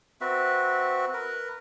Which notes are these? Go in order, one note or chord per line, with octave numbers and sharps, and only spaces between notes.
C4 F#4 B4 E5
A#4 B4